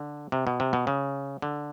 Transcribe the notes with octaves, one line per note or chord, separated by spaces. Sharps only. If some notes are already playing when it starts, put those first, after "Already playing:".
Already playing: D3
C3
B2
C3
B2
C#3
D3